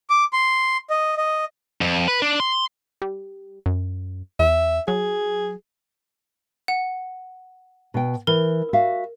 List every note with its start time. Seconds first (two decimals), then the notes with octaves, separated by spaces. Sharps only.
0.10 D6
0.33 C6
0.90 D#5
1.17 D#5
1.81 F2
2.08 B4
2.22 D4
2.40 C6
3.02 G3
3.66 F#2
4.39 E2 E5
4.88 F#3 G#4
6.68 F#5
7.94 B2 G5
8.27 E3 A#4
8.73 F#4 E5 F5